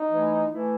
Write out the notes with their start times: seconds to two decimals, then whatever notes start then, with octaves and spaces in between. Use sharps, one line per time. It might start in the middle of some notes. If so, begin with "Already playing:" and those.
Already playing: D#4
0.10 E3 A3 E4
0.50 E3 A3 E4